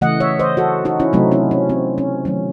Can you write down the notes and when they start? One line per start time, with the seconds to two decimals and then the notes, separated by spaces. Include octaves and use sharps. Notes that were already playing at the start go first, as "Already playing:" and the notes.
0.01 C#3 E3 A3 D#5 F#5
0.20 C#5 E5
0.39 C5 D#5
0.57 F#4 A4
0.85 D#4 F#4
1.00 C#4 E4
1.13 C3 F#3 A3 C4 D#4
1.32 C#4 E4
1.51 C#4
1.70 C4
1.98 C#4
2.25 D#3 F#3 A3 C#4